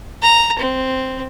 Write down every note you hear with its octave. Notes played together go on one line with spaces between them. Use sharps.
A#5
C4